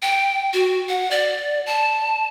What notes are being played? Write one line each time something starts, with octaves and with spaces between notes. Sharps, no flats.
G5
F#4
F#5
D5
A5